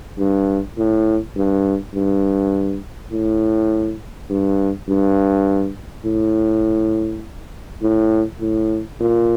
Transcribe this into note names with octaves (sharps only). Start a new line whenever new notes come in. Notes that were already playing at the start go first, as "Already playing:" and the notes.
G2
A2
G2
G2
A2
G2
G2
A2
A2
A2
A#2